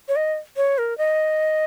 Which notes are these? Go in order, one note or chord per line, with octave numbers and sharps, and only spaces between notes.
C#5
D#5
C#5
A#4
D#5